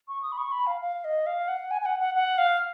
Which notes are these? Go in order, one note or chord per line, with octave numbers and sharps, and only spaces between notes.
C#6
D#6
B5
C#6
B5
F5
F5
D#5
F5
F#5
G#5
G#5
F#5
F#5
F#5
F5